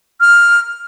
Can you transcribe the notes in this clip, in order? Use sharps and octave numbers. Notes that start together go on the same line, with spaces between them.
F6